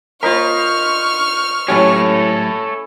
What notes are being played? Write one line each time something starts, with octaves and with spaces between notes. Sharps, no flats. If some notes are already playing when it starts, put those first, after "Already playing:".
F4 A#4 C5 D#5 B5 C#6 F6
A2 F#3 C#4 E4 G4 A4 C#5